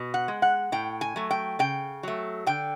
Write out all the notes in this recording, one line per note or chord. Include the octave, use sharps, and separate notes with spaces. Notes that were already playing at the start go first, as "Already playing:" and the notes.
Already playing: B2
F#5
G#3
F#5
A2 G5
G#5
F#3 A3
G5
C#3 G5
F#3 A3
D3 G5